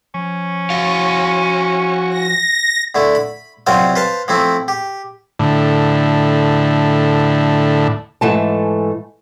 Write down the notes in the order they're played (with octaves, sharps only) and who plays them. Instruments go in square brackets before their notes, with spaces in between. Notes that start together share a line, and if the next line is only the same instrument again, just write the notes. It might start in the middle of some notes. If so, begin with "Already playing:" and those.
[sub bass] F3 [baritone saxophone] C#4
[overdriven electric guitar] F#4 F5
[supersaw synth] A#6
[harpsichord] D3 A3 E4
B5
C2 F#3 C4 F4 C5 F5
B4 C5 F5 A5
F3 A3 C4 E4
G4
[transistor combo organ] A2 D3
[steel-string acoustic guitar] G#2 E3 A3 A5